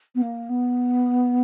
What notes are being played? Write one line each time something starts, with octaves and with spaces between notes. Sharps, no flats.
B3
A#3
B3